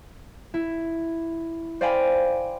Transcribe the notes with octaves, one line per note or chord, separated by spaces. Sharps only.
E4
C5 D5 F5 G5 G#5 B5